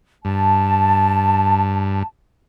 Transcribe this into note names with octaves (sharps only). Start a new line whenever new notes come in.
G2 A5